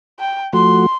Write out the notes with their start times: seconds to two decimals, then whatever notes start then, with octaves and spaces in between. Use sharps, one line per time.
0.20 G5
0.53 F3 A3 F#4 C6